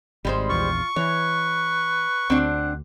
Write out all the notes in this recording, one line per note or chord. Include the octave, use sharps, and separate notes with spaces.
G#1 G3 G#3 C5
A#1 E2 F4 C#6
E3 B4 C#5
D2 C4 D4 F#5